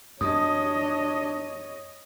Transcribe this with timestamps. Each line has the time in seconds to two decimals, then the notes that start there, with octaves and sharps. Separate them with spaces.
0.21 F#2 D4 C#5 D#5 D#6